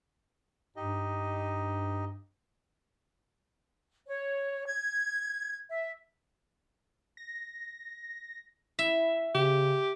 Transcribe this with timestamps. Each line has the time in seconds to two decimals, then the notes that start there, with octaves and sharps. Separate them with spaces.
0.76 G2 D#4 G4 D#5
4.07 C#5
4.66 G#6
5.69 E5
7.17 A#6
8.79 E4 E5
9.35 C#3 G4